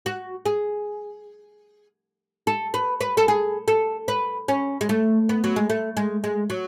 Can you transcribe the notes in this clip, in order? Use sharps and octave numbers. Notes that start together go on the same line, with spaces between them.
F#4
G#4
A4
B4
B4
A4
G#4
A4
B4
C#4
G#3
A3
B3
F#3
G#3
A3
G#3
G#3
F#3